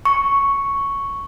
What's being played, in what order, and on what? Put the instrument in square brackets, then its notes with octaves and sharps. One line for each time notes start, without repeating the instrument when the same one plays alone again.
[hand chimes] C#6